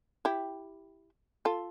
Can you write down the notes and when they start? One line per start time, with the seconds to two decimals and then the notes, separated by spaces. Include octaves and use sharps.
0.25 E4 G4
1.45 F4 A4